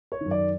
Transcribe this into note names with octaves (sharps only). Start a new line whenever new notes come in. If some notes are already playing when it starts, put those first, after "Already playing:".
C#5
F#2 D#3
D5